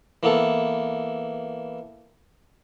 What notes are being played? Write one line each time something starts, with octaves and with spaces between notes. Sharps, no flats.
E3 A#3 B3 A4